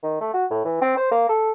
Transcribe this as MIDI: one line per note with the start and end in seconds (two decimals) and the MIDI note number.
0.03 0.21 51
0.21 0.34 57
0.34 0.46 66
0.51 0.61 45
0.65 0.81 52
0.82 0.92 60
0.97 1.09 72
1.11 1.26 58
1.29 1.51 69